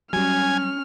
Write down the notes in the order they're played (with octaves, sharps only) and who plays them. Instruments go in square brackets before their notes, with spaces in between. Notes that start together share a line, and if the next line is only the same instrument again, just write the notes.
[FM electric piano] F#3 G3 [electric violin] C#4 F6 [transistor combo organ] G#5